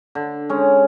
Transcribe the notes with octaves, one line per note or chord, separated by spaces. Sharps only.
D3
G#3 C#4